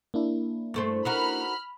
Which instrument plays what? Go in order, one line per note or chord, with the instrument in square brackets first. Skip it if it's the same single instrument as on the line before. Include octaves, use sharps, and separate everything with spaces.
[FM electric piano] A#3 D4 E4
[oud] G2 A3 C5
[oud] D#4 F#4 A#4 [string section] B5 F6